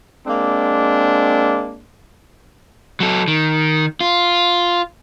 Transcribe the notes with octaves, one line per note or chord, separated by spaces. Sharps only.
G#3 A#3 C4 D4
F#3 A4
D#3
F4